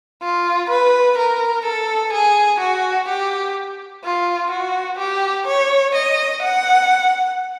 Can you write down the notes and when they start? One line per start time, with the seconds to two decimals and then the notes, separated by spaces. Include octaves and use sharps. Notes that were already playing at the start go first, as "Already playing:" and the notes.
0.22 F4
0.70 B4
1.18 A#4
1.65 A4
2.13 G#4
2.60 F#4
3.09 G4
4.04 F4
4.51 F#4
4.99 G4
5.47 C#5
5.95 D#5
6.43 F#5